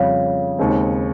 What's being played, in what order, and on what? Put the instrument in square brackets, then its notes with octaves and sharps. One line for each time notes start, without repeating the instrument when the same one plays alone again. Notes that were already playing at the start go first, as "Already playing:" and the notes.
Already playing: [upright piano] F2 C#3 G3 C4 [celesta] C#5 F5
[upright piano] D#2 C#3 G#3 C4 D#4